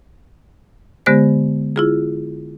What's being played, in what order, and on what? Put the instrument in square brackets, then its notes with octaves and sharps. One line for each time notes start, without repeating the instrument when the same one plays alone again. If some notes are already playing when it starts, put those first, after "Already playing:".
[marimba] D3 G#3 B3 G4 C5 A#6
E4 F4 G#4